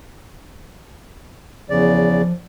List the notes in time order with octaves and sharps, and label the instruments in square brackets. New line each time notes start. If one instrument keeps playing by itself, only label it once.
[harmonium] E2 C#3 D5 [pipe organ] F3